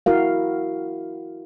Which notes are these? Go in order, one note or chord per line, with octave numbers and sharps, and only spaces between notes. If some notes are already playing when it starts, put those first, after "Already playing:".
E4 F#4 A#4 F5